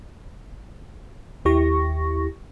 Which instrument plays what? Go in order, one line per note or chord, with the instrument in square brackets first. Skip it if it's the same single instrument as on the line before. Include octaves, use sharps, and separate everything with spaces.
[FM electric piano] D#2 E4 G4 C#6 A#6